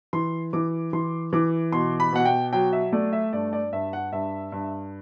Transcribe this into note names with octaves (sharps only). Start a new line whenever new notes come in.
E3 C6
E3 D6
E3 C6
E3 D6
B2 C6
B5
B2 F#5
G5
F#3 G5
E5
A3 D5
E5
G2 D5
D5
G2 E5
F#5
G2 E5
G2